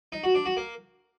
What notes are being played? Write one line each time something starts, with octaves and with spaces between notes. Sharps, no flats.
D#4
F#4
D4
F#4
A#3